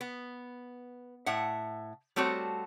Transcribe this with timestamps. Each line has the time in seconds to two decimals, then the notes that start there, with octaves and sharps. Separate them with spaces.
0.01 B3
1.26 A2 E5 F#5
2.16 G3 A3 C4 F#4 C#5